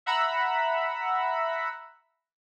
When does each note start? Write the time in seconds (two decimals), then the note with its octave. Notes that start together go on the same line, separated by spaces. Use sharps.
0.06 E5 F#5 A#5 B5 E6